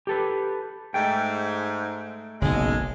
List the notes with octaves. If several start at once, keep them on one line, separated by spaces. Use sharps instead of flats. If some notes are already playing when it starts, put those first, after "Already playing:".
G4 A4 B4
G#2 A3 G5
F#1 B1 G#3